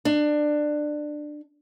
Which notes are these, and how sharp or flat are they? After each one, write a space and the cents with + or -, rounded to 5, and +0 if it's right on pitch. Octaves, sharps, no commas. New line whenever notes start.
D4 +20